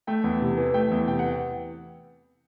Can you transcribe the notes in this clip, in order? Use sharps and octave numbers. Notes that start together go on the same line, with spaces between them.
A3 G5
E2
C3
E3
A3 G5
E2
C3 G5
E3 F#5